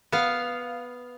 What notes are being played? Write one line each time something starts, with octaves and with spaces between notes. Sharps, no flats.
B3 F5